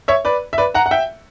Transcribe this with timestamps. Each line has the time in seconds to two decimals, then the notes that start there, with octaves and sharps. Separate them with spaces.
0.08 C#5 E5
0.25 B4 D5
0.53 E5
0.58 B4 D5
0.74 F#5 A#5
0.86 F#5
0.91 E5 G5